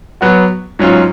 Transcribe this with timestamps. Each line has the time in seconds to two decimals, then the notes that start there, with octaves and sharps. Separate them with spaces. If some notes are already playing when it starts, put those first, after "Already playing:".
0.21 F#3 B3 F#4
0.79 G#2 F#3 C#4 F4